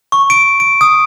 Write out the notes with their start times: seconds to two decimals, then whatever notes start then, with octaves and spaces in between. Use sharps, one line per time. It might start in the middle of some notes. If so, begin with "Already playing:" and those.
0.12 C#6
0.30 D7
0.60 D7
0.81 D#6